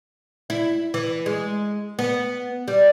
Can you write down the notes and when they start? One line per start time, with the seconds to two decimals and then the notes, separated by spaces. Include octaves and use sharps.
0.50 E4
0.94 E3
1.26 G#3
1.99 B3
2.68 G3